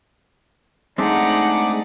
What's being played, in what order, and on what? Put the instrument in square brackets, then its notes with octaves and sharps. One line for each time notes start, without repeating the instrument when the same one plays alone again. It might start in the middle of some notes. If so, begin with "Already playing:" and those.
[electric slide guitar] G#3 A3 C4 [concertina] D4 G#4 D6 [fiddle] D#4 F#5